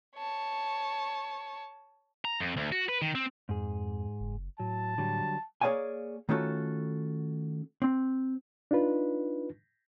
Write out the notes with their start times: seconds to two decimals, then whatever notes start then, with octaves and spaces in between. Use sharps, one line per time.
0.17 C#5 A5
2.25 A#5
2.40 F2
2.57 D2
2.72 F#4
2.89 B4
3.02 D#3
3.15 C4
3.49 F2 G#2 G#4
4.20 F#1
4.60 A2 F#3 A5
4.98 D3 F#3 G3
5.61 A#3 G#4 C#5 D5 F5 G#5
6.29 D#3 A3 C#4 F4 F#4 A4
7.82 C4
8.71 D4 D#4 F4 B4